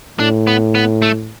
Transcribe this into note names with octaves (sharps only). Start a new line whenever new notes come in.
A2 D4
B3
B3
A3